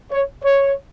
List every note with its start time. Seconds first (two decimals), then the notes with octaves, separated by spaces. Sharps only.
0.12 C#5
0.43 C#5